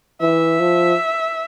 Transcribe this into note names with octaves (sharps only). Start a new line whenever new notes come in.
E3 E5
F3